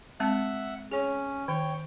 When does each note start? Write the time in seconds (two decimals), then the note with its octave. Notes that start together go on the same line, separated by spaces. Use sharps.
0.20 G#3 C4 E5 F#5 A5
0.91 C#4 G#4 C#5
1.48 D#3 C#5 G5